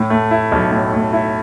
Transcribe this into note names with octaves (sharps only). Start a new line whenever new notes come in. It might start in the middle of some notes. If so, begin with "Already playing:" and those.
Already playing: A2
A3
E4
B1
A2
A3
E4